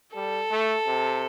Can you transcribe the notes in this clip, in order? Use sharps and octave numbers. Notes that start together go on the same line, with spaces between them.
G3 A4
A3
C3